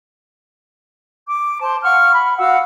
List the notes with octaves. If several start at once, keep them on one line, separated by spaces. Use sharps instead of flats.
D6
C5 A5
F5 F#5 C#6 F6
B5
F#4 F5 F#5 E6